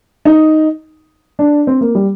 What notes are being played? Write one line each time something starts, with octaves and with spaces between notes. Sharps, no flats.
D#4
D4
C4
A#3
G3